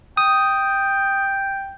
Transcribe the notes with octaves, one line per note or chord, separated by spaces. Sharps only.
G5 D#6